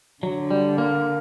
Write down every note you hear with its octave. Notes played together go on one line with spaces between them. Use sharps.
D3 F#3
G3
A#3